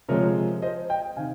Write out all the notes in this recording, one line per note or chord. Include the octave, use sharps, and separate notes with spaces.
C3 F3 G#3 A#4 C#5
C5 D#5
D#5 G5
C3 D#3 F5 G#5